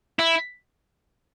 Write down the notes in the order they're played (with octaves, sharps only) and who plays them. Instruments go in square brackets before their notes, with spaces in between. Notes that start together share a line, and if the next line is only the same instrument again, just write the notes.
[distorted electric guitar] E4